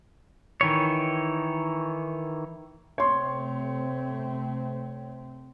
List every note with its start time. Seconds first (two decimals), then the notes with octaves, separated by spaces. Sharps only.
0.61 D#3 E3 C#5
2.98 C3 A3 C4 C#5 C6